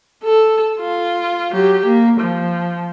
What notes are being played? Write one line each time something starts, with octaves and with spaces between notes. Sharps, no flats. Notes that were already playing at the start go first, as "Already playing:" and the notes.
A4
F4
F#3 G4
A#3
F3